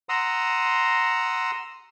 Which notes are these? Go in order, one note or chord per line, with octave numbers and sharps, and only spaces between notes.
F#5 A#5 C6 D#6 E6